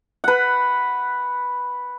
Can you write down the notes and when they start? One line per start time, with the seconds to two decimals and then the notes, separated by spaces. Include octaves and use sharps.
0.24 B4 F#5